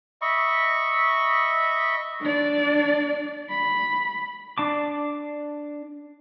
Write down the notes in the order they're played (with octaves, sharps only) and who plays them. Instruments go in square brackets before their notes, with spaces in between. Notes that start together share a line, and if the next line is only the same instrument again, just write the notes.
[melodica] D#5 E5 B5 C#6
[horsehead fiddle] D4 D5
B5
[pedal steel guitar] D4 A5 D6